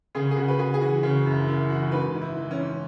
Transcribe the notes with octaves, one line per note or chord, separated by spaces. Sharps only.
C#3 G#4
G#4
C#3 F#4
B4
C#3 G#4
G#4
E3 F#4
C#3
F#2 E4
F#2 E4
E3 F#4
G#2 B4
G#2
E4
E3
C#4
G#2